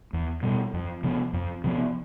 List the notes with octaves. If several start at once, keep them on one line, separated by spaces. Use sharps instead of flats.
E2
B2 G3
F2
C3 F3 B3
F2
C3 F3 B3